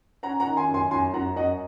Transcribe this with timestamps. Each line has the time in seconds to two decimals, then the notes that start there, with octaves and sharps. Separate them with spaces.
0.23 C#4 F#5 A#5
0.40 F#5 A#5
0.46 D#3
0.57 G#5 C6
0.69 F#2
0.74 G#5 C6
0.91 F#2 G#5 C6
1.14 F#2 F#5 A#5
1.36 F#2 D#5 F#5